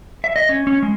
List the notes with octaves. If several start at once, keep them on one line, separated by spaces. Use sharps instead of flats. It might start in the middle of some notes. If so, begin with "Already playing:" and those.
E5
D#5
C#4
C#4
G#3